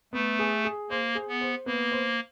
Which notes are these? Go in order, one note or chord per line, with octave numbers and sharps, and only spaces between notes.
A3 B3
G#4
G#4
A#3 C5
G#4
B3
C5
A#3 B3
C5